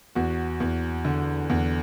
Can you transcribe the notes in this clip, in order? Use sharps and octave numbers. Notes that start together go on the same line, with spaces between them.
E2 F#4
E2
D3
E2